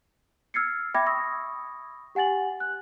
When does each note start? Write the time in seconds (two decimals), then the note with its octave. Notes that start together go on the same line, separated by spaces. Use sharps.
0.54 E6 F6 G#6 A6 C7 C#7
0.95 E5 G5 B5 D6 G#6 A#6
1.06 B5 C#6 D#6 E6 A#6
2.15 G4 F#5 G#5 A6 F#7
2.60 F#6